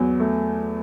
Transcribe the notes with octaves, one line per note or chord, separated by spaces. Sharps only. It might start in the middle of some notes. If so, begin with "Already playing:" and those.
Already playing: E2 F#3
A3